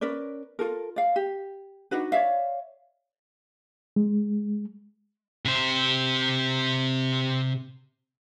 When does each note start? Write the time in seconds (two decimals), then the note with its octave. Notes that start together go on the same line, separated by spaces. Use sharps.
0.01 C#4 A#4 B4 D5
0.59 F4 A4 A#4
0.96 D5 F5
1.16 G4
1.91 D4 D#4 F#4 B4
2.12 C#5 D5 E5 F5
3.96 G#3
5.45 C3 C5